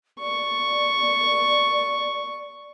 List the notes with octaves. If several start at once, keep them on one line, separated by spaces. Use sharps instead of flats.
D5 C#6